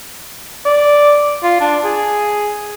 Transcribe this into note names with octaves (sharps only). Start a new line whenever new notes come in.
D5
F4
D4
G#4